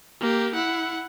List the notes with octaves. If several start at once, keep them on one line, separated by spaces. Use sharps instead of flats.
A#3 G4
E4 F#5